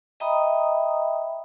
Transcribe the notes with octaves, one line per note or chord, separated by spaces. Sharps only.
D#5 E5 G5 A#5 B5 D#6